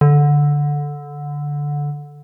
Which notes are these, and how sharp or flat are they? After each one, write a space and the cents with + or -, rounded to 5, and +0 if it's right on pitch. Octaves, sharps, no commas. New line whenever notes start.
D3 -10